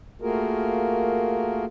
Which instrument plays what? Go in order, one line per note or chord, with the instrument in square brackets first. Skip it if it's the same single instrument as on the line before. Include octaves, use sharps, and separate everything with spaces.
[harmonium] A3 A#3 F4 F#4 G#4 A#4